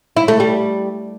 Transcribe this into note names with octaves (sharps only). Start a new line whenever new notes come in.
E4
A3
G3